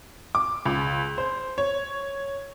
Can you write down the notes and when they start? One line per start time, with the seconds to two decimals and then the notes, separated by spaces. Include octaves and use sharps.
0.35 D6
0.66 C#2
1.18 C5
1.58 C#5